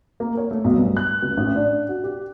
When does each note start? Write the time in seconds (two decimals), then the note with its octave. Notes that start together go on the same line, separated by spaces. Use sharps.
0.20 A#3
0.37 C#5
0.51 A3
0.64 B1
0.78 G2
0.97 F#6
1.22 C#2
1.37 A1
1.56 D4
1.89 F#4
2.04 G4